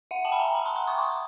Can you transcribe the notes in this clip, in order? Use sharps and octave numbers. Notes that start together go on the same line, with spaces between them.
E5 F#5
G5 A5
B5
G#5 A#5
A5 B5
A#5 C6
A#5 C6
C#6 D#6
C6 D6